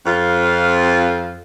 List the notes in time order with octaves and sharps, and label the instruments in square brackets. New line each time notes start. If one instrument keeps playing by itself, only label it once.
[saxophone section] F2 F4